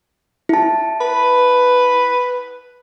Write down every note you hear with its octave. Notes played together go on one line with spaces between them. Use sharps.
E4 A5
B4